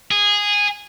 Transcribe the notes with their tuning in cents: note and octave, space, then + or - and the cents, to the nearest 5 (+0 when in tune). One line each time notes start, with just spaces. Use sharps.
G#4 -10